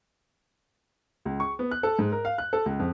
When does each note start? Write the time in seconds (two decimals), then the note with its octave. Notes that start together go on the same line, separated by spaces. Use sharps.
1.25 C#2
1.40 C#6
1.59 B3
1.71 F#6
1.83 A4
1.99 G#2
2.12 A#4
2.25 F5
2.38 F#6
2.53 A4
2.66 C#2
2.79 F2